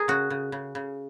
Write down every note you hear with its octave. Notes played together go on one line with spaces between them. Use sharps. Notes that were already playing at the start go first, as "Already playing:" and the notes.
Already playing: G#4 A#4
C#3 F#4
C#3
C#3
C#3